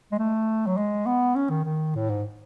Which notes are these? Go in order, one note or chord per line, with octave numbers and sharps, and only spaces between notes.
G#3
A3
F#3
G#3
B3
C#4
D#3
D#3
A2
G#2